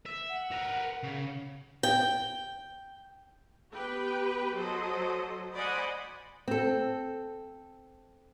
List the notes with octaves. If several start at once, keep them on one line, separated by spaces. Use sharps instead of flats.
E5
F#5
A#4 B4
C#3
G5
B3 G4 B4 G5
F#3 A4 C5 D#5
C5 D5 D#5 F#5 G#5 B5
C4 A4